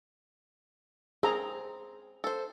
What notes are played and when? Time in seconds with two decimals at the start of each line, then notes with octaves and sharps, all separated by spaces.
1.23 C4 G#4 A#5
2.24 A4 C5